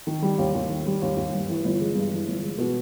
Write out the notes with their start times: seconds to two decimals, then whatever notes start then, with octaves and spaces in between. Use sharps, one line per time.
0.07 D#3
0.22 G3
0.38 D#2
0.55 D#2
0.70 D#3
0.86 G3
1.02 D#2
1.17 D#2
1.33 G2
1.48 E3
1.64 G1
1.80 G#3
1.95 G2
2.12 E3
2.27 G1
2.43 G#3
2.58 B2